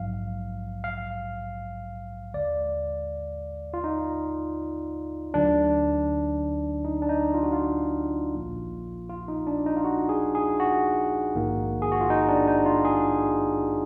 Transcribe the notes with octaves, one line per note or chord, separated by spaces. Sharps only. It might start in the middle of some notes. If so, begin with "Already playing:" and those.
Already playing: A#1 G#2 F#3 F5
F5
D#2 D3 G#3 D5
F4
D#4
D2 D3 F#3 D4
D#4
D4
D#4
F4
F#4
F4
A#1 A#2 F3 A#3
F4
D#4
D4
D#4
F4
F#4
G#4
G#4
F#4
A#1 G#2 D#3 A#3
G#4
F#4
F4
D#4
D4
D#4
F4
G#4